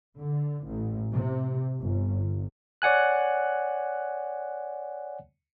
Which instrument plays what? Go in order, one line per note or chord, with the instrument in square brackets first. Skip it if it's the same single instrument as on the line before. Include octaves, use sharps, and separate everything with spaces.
[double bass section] D3
A1
C3
G1
[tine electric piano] C#5 D5 F#5 G#5 F#6